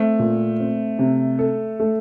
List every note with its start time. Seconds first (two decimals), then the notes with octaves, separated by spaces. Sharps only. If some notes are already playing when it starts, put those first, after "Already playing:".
Already playing: A3 C4
0.19 A#2
0.60 C4
0.99 C3
1.39 A4
1.79 A3